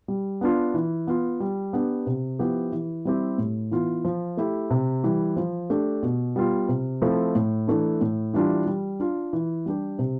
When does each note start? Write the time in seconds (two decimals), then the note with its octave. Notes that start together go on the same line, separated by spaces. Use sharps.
0.08 G3
0.41 B3 D4 F4
0.74 E3
1.07 B3 F4
1.40 G3
1.73 B3 D4 G4
2.07 C3
2.39 F3 B3 E4 G4
2.72 E3
3.05 G3 C4 E4 G4
3.38 A2
3.71 E3 B3 F4
4.05 F3
4.37 A3 E4 G4
4.70 C3
5.04 E3 G3
5.36 F3
5.70 A3 D4 G4
6.03 B2
6.36 G3 B3 F4
6.69 C3
7.02 F3 A3 C4 E4
7.35 A2
7.67 E3 A3 D4
8.01 A2
8.34 E3 G3 D4 F4
8.66 G3
9.00 D4 F4
9.33 E3
9.66 G3 D4 G4
9.99 C3